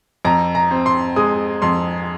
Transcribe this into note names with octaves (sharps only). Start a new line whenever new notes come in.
F2 A#5
A#5
C4
C6
G#3 D#6
F2 C6